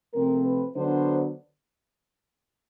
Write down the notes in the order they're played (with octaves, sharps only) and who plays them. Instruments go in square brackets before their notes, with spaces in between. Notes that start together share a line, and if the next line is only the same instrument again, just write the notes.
[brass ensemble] C3 F3 A3 C4 A#4
B4
D3 F#3 B3 D4 C5